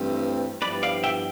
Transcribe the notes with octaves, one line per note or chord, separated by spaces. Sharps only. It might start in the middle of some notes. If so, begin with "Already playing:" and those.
Already playing: G2 E3 A3 C4
G2 F3 B3 E4 G4 B4 D5
D5 F5
E5 G5